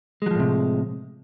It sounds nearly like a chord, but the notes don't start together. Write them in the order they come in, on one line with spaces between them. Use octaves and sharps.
G#3 F#3 F3 A2 C3